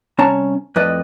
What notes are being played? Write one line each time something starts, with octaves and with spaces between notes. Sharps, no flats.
C2 C#4 C#5 A5 A#5
F2 A2 B4 D5 D#5